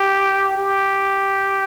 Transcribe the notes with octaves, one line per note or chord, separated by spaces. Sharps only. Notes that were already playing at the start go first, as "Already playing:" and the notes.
Already playing: G4
G4